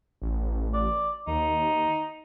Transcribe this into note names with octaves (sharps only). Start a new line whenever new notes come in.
A1
D5
D#2 D#4